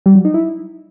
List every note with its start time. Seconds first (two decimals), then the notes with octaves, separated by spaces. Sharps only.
0.06 G3
0.15 F#3
0.25 D#4
0.34 E4